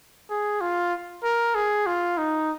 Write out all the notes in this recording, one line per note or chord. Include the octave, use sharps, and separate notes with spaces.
G#4
F4
A#4
G#4
F4
D#4